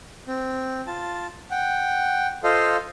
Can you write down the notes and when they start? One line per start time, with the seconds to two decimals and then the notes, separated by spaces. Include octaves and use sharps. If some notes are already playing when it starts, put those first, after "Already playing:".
0.28 C4
0.87 F4 A5
1.51 F#5 G5
2.44 F4 A4 C5 D#5 F5